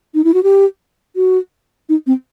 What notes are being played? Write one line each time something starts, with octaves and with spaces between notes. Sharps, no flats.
D#4
E4
F#4
G4
F#4
D#4
C4